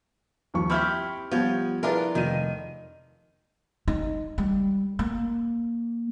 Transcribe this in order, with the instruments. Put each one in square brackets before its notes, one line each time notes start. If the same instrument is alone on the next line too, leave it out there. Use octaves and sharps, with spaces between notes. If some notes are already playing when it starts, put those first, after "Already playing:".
[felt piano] D#2 F3 C#6
[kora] C4 E4 G4 [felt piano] B5 C#6 F6
[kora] F3 C#5 [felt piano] G3 B3
[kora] D4 F4 A#4 [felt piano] E4 G#4 B4
[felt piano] F1 D#7 [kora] D#3
[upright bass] D#4
G3
A#3